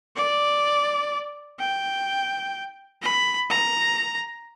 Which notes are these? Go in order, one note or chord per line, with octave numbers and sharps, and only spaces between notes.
D5
G5
B5
A#5